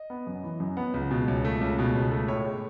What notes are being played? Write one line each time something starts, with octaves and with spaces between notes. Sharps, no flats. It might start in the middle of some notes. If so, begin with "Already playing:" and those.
Already playing: D#5
B3
F#2
E3
F#2
B3
C#2
B2
C#2
A3
C#2
B2
C#2
A3
A2 C#5
G#3